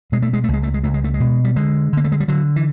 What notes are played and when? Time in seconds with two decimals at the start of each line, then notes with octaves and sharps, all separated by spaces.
0.12 B2 G#3
0.22 A3
0.33 G#3
0.44 A3
0.48 C#2
0.54 G#3
0.63 A3
0.74 G#3
0.83 C#2 A3
0.94 G#3
1.04 A3
1.14 G#3
1.20 B2
1.44 G3
1.56 D3 G#3
1.93 D3 A#3
2.04 A3
2.12 G#3
2.20 G3
2.28 D3 F#3
2.56 E3